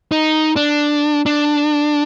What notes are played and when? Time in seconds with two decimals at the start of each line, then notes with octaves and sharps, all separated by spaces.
0.12 D#4
0.56 D4
1.26 D4